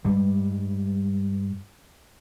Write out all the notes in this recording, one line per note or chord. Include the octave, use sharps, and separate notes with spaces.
G2 G3 G#3